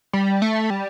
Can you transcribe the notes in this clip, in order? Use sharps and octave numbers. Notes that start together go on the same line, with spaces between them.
G3
A3
G3